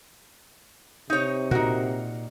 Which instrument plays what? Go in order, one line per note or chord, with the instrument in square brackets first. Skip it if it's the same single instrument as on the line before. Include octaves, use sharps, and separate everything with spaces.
[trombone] C3 [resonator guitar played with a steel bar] D#4 C#5
[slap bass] A#2 [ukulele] D#4 F#4 [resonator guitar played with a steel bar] A#4